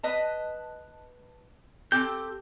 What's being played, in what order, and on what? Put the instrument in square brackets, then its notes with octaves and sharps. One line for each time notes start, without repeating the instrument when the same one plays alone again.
[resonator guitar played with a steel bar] B4 D#5 A5
[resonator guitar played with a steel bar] C4 G4 A4 [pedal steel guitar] G6